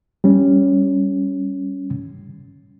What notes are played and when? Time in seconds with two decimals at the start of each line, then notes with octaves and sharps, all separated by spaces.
0.24 G3 C#4